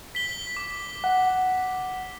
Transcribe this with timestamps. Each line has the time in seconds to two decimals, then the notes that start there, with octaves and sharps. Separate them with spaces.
0.15 B6 G7
0.57 D6
1.04 F#5